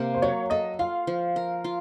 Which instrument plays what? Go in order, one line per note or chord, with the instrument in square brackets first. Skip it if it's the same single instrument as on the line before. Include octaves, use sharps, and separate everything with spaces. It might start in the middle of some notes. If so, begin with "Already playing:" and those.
Already playing: [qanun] C3 A#3
[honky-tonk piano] C5
[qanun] F#3 [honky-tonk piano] C#5
[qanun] A4 [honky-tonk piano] D#5
[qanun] F4 [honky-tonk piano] F5
[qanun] F3
A#4
F4